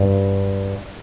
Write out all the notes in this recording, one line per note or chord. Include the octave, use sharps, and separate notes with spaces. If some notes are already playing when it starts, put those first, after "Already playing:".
Already playing: G2